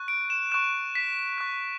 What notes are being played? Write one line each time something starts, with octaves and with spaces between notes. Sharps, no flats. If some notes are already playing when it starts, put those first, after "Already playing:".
Already playing: C#6 F#6
D7
E7
C#6 F#6 E7
B6
C#6 F#6